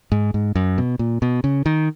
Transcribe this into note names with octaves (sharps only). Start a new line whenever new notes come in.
G#2
G#2
F#2
B2
A#2
B2
C#3
D#3